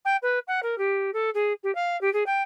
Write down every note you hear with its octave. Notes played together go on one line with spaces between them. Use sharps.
G5
B4
F#5
A#4
G4
A4
G#4
G4
F5
G4
G#4
G5